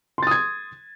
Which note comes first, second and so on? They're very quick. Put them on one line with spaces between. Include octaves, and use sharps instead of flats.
C6 A6 D#6 G#6